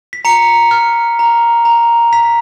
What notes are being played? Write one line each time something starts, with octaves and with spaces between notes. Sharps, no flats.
B6
A#5 C#7
F6
A#5
A#5
A#5 B6